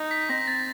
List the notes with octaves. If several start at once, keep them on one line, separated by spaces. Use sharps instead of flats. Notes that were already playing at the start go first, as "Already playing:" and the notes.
Already playing: D#4
B6
C4 A#6
A6